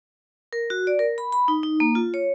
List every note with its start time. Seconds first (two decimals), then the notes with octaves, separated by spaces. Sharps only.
0.53 A#4
0.70 F#4
0.87 D5
0.99 A#4
1.18 B5
1.32 B5
1.48 D#4
1.63 D#4
1.80 A#3
1.95 F4
2.14 C#5